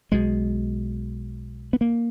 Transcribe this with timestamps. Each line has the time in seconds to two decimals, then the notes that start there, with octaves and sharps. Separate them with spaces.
0.12 B1 B2 G#3
1.73 B3
1.81 A#3